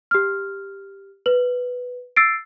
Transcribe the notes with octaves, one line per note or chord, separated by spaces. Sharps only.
G4 F6
B4 F#7
E6 A6 C7 D7